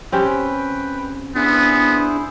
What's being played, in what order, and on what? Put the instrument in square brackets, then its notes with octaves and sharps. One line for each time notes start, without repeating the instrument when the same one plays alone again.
[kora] C4 C#4 G4 [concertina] B4 G5
[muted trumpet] B3 [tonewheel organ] D4 [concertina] E4 G#4 C5